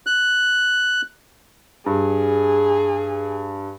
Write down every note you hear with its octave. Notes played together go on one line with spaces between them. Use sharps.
F#6
G2 G#4